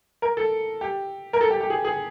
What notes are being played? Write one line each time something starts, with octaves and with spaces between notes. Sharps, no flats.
A#4
A4
G4
A#4
A4
G4
G4
G#4
G#4